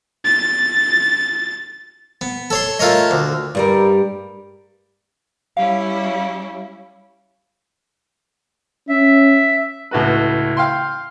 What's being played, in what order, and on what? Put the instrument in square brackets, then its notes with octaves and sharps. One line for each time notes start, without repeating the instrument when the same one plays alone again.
[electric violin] A6
[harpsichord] B3
A4 C#5 C6
A3 F4 A#4 C#5 D#5
D2
[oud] G2 G3 A#4
[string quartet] G3 C#4 E4 [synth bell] F5
[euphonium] C#4 [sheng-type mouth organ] E5
[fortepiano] C#2 A2 F#4 B4
F5 G5 C6